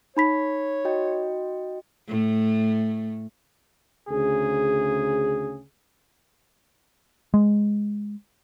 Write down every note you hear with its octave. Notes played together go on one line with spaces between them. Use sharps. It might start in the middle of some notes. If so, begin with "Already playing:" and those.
D#4 C#5 B5 B6
F#4 D#5 G5
A2 A3
D2 C#3 G#4
G#3